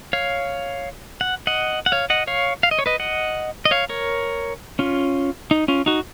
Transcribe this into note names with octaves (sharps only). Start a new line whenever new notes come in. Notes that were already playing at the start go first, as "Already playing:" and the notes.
C#5 F5
F#5
D#5 F#5
F#5
C#5 F5
D#5 F#5
C#5 F5
F5
D#5
C#5
B4 D#5
D#5 F#5
D#5
C#5 F5
A#4 C#5
C#4 F4
D#4
C#4 F4
D#4 F#4